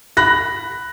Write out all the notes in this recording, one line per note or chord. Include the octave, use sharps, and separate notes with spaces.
B5 F#6 A#6